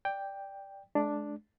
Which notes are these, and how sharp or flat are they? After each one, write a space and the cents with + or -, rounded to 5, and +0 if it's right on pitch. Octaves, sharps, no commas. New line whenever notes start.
D5 +0 G5 +5
G#3 +40 D4 +0